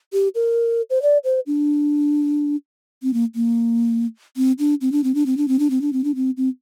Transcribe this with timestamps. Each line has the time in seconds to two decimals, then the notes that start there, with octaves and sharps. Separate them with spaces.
0.13 G4
0.35 A#4
0.90 C5
1.02 D5
1.24 C5
1.47 D4
3.03 C4
3.13 A#3
3.35 A#3
4.37 C4
4.59 D4
4.81 C4
4.92 D4
5.04 C4
5.15 D4
5.26 C4
5.37 D4
5.48 C4
5.59 D4
5.70 C4
5.81 D4
5.93 C4
6.04 D4
6.15 C4
6.37 C4